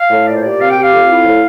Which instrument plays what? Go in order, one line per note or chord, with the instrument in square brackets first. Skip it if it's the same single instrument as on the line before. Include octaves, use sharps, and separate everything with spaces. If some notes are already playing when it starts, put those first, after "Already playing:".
Already playing: [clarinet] F5
[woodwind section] A2
[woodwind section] A#2 [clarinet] D5
[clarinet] C5
[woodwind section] G4 [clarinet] D5
[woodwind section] C3 [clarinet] F5
[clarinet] G5
[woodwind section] G4
[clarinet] F5
[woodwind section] F2
E4
A2